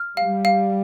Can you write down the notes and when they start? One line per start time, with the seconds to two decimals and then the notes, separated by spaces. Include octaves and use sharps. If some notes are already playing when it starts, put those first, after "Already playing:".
Already playing: F6
0.17 G3 F5
0.45 F5